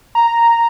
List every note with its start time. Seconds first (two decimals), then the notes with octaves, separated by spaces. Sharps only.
0.15 A#5